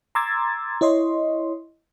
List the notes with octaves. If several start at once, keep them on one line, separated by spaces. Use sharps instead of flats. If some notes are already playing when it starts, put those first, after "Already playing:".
A#5 C6 D6 E6 G#6 A6
E4 C#5 D#5 C6